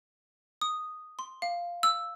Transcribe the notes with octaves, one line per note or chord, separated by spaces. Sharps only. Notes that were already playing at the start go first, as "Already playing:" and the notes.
D#6
C6
F5
E6